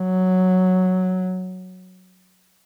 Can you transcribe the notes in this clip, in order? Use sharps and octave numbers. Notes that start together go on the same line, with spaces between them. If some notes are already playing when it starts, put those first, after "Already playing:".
Already playing: F#3